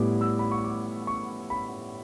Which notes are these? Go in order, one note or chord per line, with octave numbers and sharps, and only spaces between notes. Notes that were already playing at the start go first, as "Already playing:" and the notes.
Already playing: A2 G3 B3 E4 D6
E6
B5
C#6
D6
C#6
B5